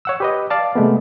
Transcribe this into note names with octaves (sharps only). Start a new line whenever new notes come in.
C#5 F#5 E6
G4 B4 D#5
D5 F5 A5
C3 G#3 A3 B3